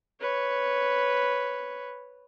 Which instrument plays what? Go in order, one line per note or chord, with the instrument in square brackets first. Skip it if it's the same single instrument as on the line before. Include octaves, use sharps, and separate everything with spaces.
[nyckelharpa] B4 C#5